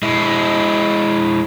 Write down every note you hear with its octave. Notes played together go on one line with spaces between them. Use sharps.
G#3 E4